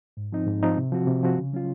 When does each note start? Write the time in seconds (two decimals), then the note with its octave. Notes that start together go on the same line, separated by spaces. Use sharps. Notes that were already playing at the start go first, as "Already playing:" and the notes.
0.17 G#2
0.32 F3 C4 D#4
0.47 G#2
0.63 F3 C4 D#4
0.77 C3
0.92 F3 C4 F#4
1.07 C3
1.23 F3 C4 F#4
1.37 C#3
1.53 F#3 C#4 F4